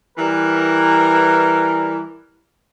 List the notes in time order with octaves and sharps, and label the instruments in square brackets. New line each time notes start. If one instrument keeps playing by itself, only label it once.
[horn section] E3 G3 A#4